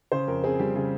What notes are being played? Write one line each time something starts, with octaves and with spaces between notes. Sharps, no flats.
C#3 C5
F2 A#4
C4 G#4
G3 G4
C#3 G#4